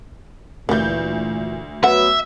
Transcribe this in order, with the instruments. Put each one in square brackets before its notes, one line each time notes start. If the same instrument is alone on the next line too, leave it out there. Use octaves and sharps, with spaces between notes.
[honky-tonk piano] D2 G6 [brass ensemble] A#2 E3 [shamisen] G3 A#3
[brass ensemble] F#3 B3 [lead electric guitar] E5 [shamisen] F#5